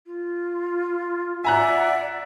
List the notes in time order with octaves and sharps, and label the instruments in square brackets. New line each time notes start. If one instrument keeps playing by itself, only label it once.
[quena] F4
[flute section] D5 F#5 [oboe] E5 [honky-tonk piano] G#5 A#5 F#6